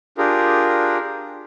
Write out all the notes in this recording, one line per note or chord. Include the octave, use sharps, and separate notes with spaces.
D4 F4 G4 G#4 A#4